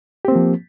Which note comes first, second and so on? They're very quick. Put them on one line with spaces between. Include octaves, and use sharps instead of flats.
G4 C4 A#3 F3